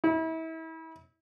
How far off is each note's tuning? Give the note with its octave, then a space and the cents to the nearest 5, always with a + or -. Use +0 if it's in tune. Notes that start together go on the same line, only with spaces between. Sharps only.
E4 -35